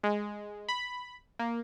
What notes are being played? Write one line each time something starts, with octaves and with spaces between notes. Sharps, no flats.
G#3
B5
A#3